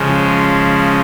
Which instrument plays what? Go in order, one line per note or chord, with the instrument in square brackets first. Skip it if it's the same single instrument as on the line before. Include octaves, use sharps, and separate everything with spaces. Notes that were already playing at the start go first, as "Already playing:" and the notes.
Already playing: [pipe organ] C#3 F3 G#3